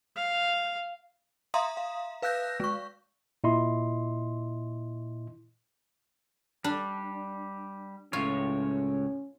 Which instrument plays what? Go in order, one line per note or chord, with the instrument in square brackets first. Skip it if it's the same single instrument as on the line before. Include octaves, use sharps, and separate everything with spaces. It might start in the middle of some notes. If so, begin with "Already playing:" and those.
[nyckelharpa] F5
[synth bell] E5 F5 A#5 C6 D#6
F5
B4 F5 E6 F#6 G6 A#6
G#3 C#6
[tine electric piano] A#2 E4 D#5 C6
[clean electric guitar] G3 [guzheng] D4
[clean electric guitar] C#2 A2 C#5 [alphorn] C#4 [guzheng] F4